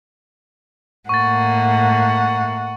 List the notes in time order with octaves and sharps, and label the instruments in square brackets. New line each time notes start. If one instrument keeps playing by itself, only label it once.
[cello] A2 A#3 [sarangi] F#5 [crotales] C#6 A6